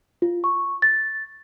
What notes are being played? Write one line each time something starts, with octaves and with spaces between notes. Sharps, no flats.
F4
C#6
A6